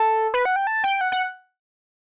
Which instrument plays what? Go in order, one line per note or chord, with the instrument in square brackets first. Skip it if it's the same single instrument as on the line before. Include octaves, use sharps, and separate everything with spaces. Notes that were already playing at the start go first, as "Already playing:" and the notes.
Already playing: [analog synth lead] A4
B4
F#5
G5
A5
G5
F#5
F#5